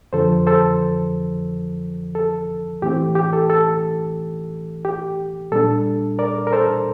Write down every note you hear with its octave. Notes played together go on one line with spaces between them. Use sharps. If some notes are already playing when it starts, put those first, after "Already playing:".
F2 D3 F3 A4 C5
A4 C5
A4
A2 E3 A3 C4 G4
G4
A4
A4
G4
A#2 G3 D4 A4
A#4 D5
A#4
A4 C5